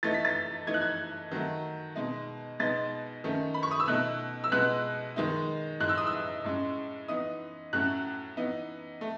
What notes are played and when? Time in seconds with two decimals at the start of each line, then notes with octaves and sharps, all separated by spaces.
0.03 E3 A3 D#4 A6
0.14 B6
0.25 A6
0.67 E3 A3 D#4 G#6
0.74 F#6
0.81 G#6
1.31 D#3 F#3 A3
1.95 B2 G#3 D#4
2.59 B2 G#3 B3 D#4 A6
3.24 D#3 A3 C#4
3.54 B5
3.63 C#6
3.71 D#6
3.80 E6
3.87 B2 A3 D#4 F#6
4.44 E6
4.52 B2 G#3 B3 F#6
5.16 D#3 G#3 D#4
5.80 A2 G#3 D#4 F#6
5.89 E6
5.98 D#6
6.07 E6
6.44 A2 G#3 C#4
7.08 E3 B3 D#4 D#6
7.73 A2 F#3 A3 C#4 F#6
8.37 E3 B3 D#4
9.01 A3